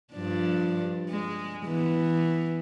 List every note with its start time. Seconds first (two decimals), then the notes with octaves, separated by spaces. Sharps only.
0.13 G2 F3 D4
1.10 G#3
1.66 E3 B3